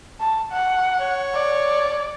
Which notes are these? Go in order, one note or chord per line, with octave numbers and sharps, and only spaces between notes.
A5
F#5
C#5
D5